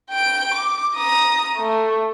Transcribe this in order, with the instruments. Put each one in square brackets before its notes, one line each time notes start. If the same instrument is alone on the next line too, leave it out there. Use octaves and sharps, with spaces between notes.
[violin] G5 D7
D6
A#5 D#6
A3